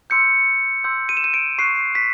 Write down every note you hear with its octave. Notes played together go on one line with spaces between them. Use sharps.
C6 E6 G6 C#7
C6 E6 G6
D#7
E7
D#7
D7
C#6 F#6 C7
B6